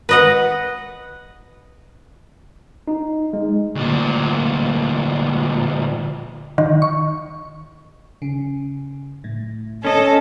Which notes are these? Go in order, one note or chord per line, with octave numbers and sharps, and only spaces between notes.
B4 D#5 F#5
D#4
G#3
D2 A#2
D#3
C#6
C#3
A2
C#4 A4 D#5